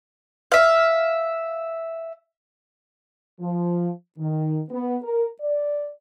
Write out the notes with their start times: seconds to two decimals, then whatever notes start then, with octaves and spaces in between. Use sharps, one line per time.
0.52 E5 F5
3.40 F3
4.18 D#3
4.71 B3
5.02 A#4
5.41 D5